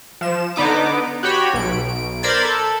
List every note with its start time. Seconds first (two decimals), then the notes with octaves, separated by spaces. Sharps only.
0.21 F3 E7
0.56 D3 B3 D#4 D6
1.23 F#4 G4 C#5 B5
1.53 B1 D7
2.23 A#4 C5 D5 B5 G#6 A6
2.45 A4